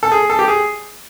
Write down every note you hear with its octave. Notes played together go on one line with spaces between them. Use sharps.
A4
G#4
A4
G4
G#4